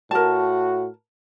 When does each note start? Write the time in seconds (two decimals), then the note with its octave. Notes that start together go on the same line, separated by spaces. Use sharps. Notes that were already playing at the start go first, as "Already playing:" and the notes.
0.11 A2 F#4 A#4 A5